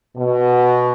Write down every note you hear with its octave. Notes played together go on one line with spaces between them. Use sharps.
B2